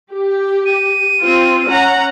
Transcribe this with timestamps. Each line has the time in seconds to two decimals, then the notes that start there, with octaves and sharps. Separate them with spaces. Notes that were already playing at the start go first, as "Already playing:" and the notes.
0.12 G4
0.66 D#7
1.22 C4 F4
1.67 C#4 F#5 A#5